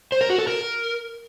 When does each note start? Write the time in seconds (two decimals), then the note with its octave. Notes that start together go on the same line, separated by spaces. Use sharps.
0.12 C5
0.21 A#4
0.30 F#4
0.39 A4
0.47 A#4